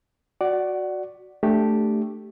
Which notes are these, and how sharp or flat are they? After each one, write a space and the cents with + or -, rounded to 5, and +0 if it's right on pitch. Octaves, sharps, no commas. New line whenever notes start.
F#4 -10 D5 +0 F#5 +20
A3 +0 D4 +0 G4 +0